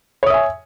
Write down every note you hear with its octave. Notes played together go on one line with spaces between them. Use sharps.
C#5 E5 G#5 D#6